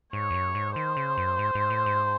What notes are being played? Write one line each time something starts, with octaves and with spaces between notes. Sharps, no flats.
G#2 C#5
E2
F#2
G#2
D#3 C5
C#3
F#2
G#2
G#2
A2
G#2